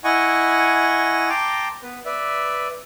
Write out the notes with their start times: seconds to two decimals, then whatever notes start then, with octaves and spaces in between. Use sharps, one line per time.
0.04 E4 D#5 F#5 G#5 C#6
1.30 G5 A5 A#5 C6 D6
1.83 B3 B4
2.05 B4 D5 E5